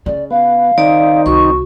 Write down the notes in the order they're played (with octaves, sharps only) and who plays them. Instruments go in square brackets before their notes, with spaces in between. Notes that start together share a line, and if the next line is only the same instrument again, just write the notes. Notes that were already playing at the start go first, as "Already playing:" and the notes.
[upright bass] C#3 [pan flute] D5
[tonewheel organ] B3 [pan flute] F5
[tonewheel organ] D#3 C4 D#4 [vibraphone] D5
[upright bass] C2 [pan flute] F#4 [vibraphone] C#6